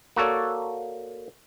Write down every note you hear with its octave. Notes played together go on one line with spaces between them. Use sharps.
A#3 F#4 A4 C#5 D5